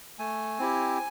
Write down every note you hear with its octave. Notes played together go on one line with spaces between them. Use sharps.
A3 G#5
C4 E4 G4